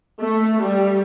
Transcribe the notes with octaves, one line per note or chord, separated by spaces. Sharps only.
A3
G3